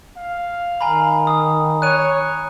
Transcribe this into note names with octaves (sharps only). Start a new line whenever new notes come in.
F5
D#3 G#5 A#5 B5
D#6
C#5 F#6 D#7